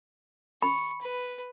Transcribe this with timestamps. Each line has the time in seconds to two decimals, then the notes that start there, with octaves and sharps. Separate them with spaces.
0.62 B5 C#6
1.02 B4